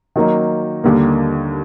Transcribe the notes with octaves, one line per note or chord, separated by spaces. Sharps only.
D#3 F#3 A#3 D#4
D#2 D3 G3 A#3